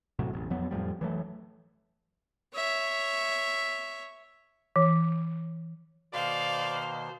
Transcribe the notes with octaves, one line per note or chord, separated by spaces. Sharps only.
E1 A2 C3 F#3
E1 A1
F2 F#3 B3
F2 A2 F3 G3
E3 F#3 A3
C#5 E5
E3
B2 D#3 A#3 C5 D5 F5